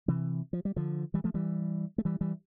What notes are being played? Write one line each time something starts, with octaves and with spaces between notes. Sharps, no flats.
C3 E3
F3
G3
D3 F3
E3 G3
F3 A3
E3 G3
A3
E3 G3
E3 G3